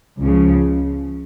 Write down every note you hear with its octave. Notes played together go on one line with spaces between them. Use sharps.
C#2 C#3 F3